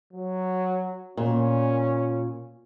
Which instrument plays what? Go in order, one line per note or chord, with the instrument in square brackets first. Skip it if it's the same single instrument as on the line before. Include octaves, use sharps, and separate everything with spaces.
[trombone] F#3
[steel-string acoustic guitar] A#2 [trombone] C#4